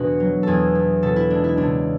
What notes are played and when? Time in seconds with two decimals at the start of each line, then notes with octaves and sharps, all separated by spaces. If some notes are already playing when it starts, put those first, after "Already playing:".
Already playing: E2 B2 D4 F#4
0.20 F#3
0.43 E2 G#4 A4
0.75 A3
1.03 B2 A4
1.16 E4
1.30 G#3 D4
1.44 E4
1.57 C#2 D4